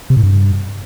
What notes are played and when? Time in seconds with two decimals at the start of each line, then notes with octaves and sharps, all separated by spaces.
0.10 C3
0.17 A2
0.23 G2